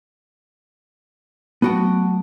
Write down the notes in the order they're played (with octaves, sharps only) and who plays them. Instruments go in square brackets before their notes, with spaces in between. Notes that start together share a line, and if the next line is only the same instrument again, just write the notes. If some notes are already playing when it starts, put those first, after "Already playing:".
[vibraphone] F#3 A3 [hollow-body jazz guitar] B3 F#4 G5